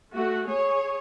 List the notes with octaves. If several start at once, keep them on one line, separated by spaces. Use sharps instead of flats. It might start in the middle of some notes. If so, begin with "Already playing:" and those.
A3 F#4
G#4 C#5